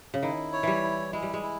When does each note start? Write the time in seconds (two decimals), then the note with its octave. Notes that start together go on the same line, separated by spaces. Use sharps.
0.14 C#3
0.23 D#3 E4
0.53 C#5
0.63 E3 G3
0.83 E4
1.13 G#3 E4
1.23 G3
1.34 G#3
1.43 E4